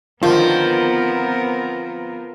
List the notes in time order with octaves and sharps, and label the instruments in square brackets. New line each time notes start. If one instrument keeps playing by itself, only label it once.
[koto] D3 D#3 [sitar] F3 [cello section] B3 C4 A#4 [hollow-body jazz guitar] F4